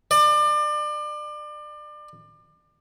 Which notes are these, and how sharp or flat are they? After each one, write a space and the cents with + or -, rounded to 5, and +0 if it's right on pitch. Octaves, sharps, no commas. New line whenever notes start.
D5 +30